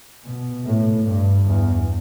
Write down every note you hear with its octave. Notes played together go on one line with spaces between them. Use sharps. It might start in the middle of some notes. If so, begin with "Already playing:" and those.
B2
A2
G2
E2